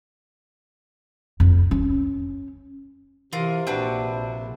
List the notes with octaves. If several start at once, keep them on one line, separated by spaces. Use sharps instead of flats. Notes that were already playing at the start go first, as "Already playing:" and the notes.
F2
C#4
C3 E3 F4 A#4 C6
A#1 C4 D4 F#4 B4